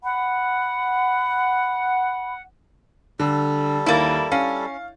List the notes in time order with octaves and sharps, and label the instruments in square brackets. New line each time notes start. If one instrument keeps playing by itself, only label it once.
[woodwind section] F#5 [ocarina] B5
[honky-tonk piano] D3 [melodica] G3 A4
[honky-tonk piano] D#2 A6 [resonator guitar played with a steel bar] A#3 E4
[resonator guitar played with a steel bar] C#4 [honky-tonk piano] F5